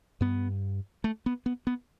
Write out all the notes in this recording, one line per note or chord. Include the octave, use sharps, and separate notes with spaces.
G2 B3
A3
B3
B3
B3